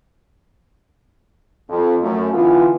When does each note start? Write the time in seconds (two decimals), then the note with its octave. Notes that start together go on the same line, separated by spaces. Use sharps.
1.69 F2
2.01 F#2 A3
2.32 D3 E3 B3 F4